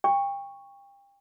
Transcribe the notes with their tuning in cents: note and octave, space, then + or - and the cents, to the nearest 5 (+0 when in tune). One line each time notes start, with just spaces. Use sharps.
G5 +30 C#6 +0